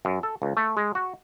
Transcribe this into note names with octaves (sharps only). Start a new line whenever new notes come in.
F#2
A4
C#2
A3
G#3
F#4